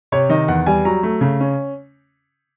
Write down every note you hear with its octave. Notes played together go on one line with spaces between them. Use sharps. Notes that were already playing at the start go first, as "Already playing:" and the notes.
C3 C#5
D#3 D#5
E2 F#5
G3 G#5
F#3 A#5
A3
C#3
C#4